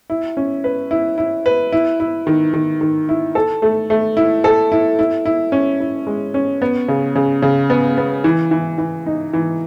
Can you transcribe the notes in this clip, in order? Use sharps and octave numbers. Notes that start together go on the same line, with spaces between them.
E4
C#4
B4
E4
E4
B4
E4
E4
D#3
D#3
D#3
E4
A4
A3
A3
E4
A4
E4
E4
E4
C#4
E4
G#3
C#4
B3
C#3
C#3
C#3
B3
B3
E3
E3
E3
D#4
E3